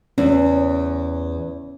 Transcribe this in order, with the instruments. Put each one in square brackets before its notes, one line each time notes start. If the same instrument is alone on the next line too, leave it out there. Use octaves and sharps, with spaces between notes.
[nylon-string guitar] E2 [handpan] C#4